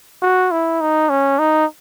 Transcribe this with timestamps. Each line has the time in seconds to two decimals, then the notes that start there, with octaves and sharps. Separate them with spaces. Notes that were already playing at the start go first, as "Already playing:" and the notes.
0.22 F#4
0.51 E4
0.81 D#4
1.10 C#4
1.39 D#4